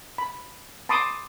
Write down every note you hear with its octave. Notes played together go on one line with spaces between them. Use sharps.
B5
A5 B5 C6 D6 D#6